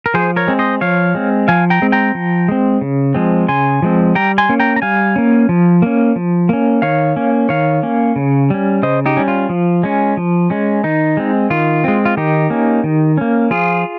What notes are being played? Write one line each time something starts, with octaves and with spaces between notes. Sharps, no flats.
A#4
F3 G#4 C5
A#4 C#5
G#3 C4
C5 D#5
F3 C#5 F5
G#3 C4
F3 F5 G#5
G5 A#5
G#3 C4
G5 A#5
F3
G#3 C4
C#3
F3 G#3 C4
C#3 G#5 C6
F3 G#3 C4
G3 G5 A#5
G#5 C6
A#3 C#4
G5 A#5
A#5
G3 F5 G#5
A#3 C#4
F3
A#3 C#4
F3
A#3 C#4
D#3 C#5 F5
A#3 C#4
D#3 C#5 F5
A#3 C#4
C#3
G3 C#4
C#3 C5 D#5
D#4 G4
G3 C#4
F4
F3
G#3 C#4
F3
G#3 C#4
D#3 D#4
G#3 C4
D#3 F4
G#3 C4
F4
D#3 D#4 G4
A#3 C#4
D#3
A#3 C#4
F3 F4 G#4